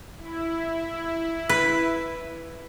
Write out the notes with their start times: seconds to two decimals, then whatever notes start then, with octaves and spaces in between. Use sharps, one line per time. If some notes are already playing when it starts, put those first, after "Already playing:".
0.18 E4
1.49 B4